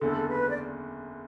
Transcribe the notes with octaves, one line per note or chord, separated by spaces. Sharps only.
F#1 E2 D3 A4
B4
D5